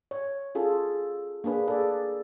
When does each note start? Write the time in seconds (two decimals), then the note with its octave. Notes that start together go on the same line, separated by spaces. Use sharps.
0.11 C#5
0.55 C#4 F4 G#4 A4
1.44 A#3 D4 G#4 B4
1.68 G#4 A4 B4 D5